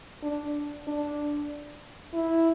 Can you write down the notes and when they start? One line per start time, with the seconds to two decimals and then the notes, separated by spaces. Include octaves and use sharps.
0.23 D4
0.87 D4
2.14 E4